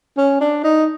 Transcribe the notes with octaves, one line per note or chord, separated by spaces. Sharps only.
C#4
D4
D#4